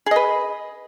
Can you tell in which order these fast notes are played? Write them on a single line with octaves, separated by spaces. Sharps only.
G#4 D#5 B4